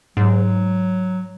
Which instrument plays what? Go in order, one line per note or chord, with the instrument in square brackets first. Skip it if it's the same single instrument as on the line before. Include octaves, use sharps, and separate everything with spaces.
[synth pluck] G#2 [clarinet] F#3